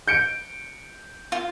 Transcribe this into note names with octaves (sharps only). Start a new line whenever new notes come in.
G6 C#7 D7
F4